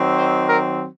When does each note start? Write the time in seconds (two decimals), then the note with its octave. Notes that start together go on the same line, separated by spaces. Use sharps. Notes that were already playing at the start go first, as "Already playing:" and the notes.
Already playing: D#3 F#3 C4
0.17 C5
0.49 A#4